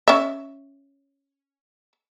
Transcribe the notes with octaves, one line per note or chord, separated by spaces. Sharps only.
C#4 E5